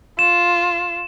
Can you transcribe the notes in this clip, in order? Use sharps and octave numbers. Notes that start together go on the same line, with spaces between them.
F4 E7